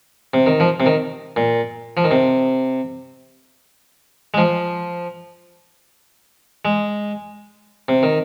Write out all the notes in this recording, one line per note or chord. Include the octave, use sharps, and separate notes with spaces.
C3
D#3
F3
C3
D#3
A#2
F3
D#3
C3
G#3
F3
G#3
C3
D#3